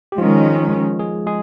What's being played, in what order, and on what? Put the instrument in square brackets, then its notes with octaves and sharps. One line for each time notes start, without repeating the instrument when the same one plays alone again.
[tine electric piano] G4
[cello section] D#3 G#3 C#4 [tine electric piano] F3 F4
[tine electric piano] G#3 G#4
G#3 G#4